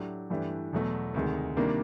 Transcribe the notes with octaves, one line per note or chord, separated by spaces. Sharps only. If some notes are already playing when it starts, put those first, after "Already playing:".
Already playing: A2 F#3 A3 D4 G4
G2 E3 A3 D4 G4
E2 B2 F#3 A3
D2 C3 D#3 G#3
C3 D#3 G3 A#3 D4